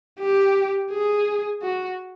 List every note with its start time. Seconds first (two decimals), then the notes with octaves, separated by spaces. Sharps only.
0.19 G4
0.91 G#4
1.62 F#4